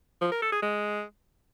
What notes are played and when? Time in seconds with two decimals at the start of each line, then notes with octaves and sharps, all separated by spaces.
0.22 F3
0.32 A#4
0.42 A4
0.52 G#4
0.63 G#3